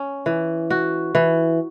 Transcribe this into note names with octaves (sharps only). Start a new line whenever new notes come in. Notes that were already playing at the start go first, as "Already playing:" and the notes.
Already playing: C#4
E3
F#4
E3